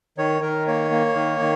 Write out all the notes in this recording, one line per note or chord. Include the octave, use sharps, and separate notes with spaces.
D#3 C#5
D#3 A#4
A#3 C#5
A#3
D#3
D#3